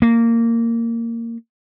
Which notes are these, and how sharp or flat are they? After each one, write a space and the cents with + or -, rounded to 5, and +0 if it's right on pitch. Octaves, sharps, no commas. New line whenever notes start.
A#3 -15